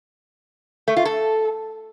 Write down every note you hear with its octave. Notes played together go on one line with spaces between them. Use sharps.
A3
F4
A4